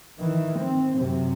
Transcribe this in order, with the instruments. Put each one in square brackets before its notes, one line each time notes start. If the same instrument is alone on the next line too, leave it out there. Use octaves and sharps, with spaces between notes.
[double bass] D#3 E3
C4
F#2 C3